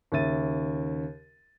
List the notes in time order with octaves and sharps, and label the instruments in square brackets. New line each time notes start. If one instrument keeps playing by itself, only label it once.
[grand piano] D#2 C#3 E5 A6 D#7